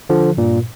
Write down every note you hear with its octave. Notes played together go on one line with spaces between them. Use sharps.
D3 F3
G2 A#2